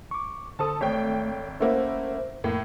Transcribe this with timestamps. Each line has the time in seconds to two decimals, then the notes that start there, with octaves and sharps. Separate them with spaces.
0.11 C#6 D6
0.59 D3 A4 C5 A5 D#6
0.81 G#1 A3 A4 C#5 G5
1.60 A3 A#3 C#4 E4 C5 F#5
2.44 F2 A2 A3 A#3